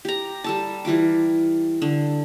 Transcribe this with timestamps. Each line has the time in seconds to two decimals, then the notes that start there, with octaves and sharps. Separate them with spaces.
0.05 G4 A#5
0.44 G3 A4 A5
0.85 E3 G3 F4 D6
1.82 D3